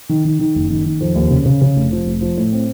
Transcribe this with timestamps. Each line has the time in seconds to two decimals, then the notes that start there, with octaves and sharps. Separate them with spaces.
0.09 D#3
0.25 D#3
0.39 D#3
0.55 F#1
0.70 D#3
0.85 D#3
1.00 F2
1.15 D#2
1.30 C#3
1.45 C#3
1.61 C#3
1.76 F1
1.92 F3
2.06 F1
2.21 F3
2.37 A2
2.52 C4